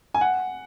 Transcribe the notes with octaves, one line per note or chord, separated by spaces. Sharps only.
G#5
F#5